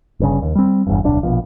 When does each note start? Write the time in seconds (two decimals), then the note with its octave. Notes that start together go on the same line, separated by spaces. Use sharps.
0.20 G1 G2 C#3
0.42 D#2
0.55 G3 C4
0.87 G1 E2 G2
1.04 D1 B1 D4
1.23 A#1 B2 F3